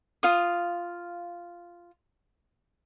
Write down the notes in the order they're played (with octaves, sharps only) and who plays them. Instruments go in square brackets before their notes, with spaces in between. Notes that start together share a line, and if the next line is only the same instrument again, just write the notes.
[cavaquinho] F4 F5 D#6